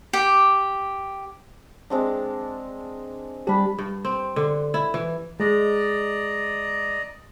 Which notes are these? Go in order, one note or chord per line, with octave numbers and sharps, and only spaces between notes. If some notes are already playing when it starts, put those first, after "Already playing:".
G4
G#3 C4 D4
G3 D4 G4 B5
G2
C4
D3
E4
E3
G#3 D5 D#5 A#5